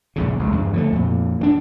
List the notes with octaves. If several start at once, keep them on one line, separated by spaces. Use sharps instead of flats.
A#1 E2 C#3
B1 D3 G#3
E2 G2 G3
D3 F3 F#3 A3
F2 A#2
E3 F3 D4